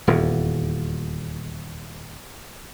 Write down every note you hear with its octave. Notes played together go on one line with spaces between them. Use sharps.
D#1 E2